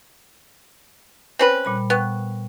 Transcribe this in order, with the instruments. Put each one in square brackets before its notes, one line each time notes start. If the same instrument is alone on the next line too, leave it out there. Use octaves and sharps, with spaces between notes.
[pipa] C4 C#4 B4 [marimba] C5
[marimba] A#2 G3 B5
[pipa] B3 [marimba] G5 C#6 F#6